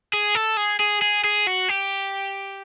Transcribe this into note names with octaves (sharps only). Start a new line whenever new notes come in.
G#4
A4
G#4
G#4
G#4
G#4
F#4
G4